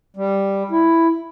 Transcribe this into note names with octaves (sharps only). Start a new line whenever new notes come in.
G3
E4